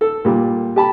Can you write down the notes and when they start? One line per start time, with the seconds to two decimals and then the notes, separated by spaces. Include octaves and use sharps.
0.01 A4
0.25 A#2 G3
0.76 G4 A5 B5